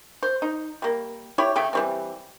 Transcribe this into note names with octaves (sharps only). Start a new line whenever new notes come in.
C5
D#4
G3 A#3
E4 G4 C#5
C#3 A3 E5 G5
E3 G3 C4